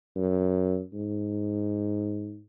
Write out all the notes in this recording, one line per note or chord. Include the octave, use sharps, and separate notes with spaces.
F#2
G#2